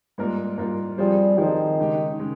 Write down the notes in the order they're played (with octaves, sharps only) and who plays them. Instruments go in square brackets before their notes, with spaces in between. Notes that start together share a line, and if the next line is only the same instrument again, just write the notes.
[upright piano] G#2 G3 A#3 F4 A#4
G#2 G3 A#3 F4 A#4
[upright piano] F3 C4 F4 G#4 C5 [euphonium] G3
[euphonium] D#3 [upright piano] F3 C4 F4 G#4 C5
[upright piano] C#3 G#3 D#4 G4
C#3 G#3